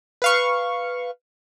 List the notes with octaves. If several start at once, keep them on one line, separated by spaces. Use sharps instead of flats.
B4 F5 C#6